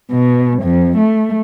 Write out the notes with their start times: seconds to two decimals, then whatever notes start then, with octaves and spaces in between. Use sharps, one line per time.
0.11 B2
0.62 F2
0.97 A3